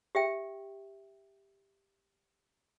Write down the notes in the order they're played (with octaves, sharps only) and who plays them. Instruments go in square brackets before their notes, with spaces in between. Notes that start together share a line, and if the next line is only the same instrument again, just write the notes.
[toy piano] G4 E5 G5